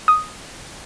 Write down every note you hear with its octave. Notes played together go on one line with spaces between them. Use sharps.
D#6